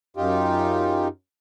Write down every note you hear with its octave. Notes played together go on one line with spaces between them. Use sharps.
F#2 D#4 F4 G4